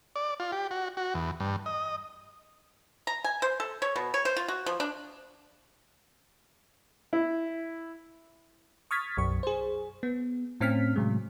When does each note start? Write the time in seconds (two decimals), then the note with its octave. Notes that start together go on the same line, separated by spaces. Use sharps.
0.16 D5
0.40 F4
0.52 G4
0.71 F#4
0.97 F#4
1.14 E2
1.40 G2
1.66 D#5
3.07 A#5
3.24 G#5
3.42 C5
3.60 A4
3.82 C#5
3.96 B2
4.14 C#5
4.25 C5
4.37 F4
4.48 F#4
4.66 F3
4.80 D4
7.13 E4
8.91 C#6 D#6 F6 G#6 A6 B6
9.17 B1 F#2 C#6
9.43 G#4 C5
10.03 B3
10.60 A2 C4 C#4 F6 B6
10.96 A2 C3 F#3 G#3